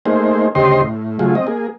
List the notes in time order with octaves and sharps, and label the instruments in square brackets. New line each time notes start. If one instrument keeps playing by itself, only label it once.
[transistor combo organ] A3 A#3 D#4 G#4 C5
D2 C#3 G4 C5 D#5 C6
A2
C#3 F#3 A3 F4 G#4
C4 D#5
A#3 G#4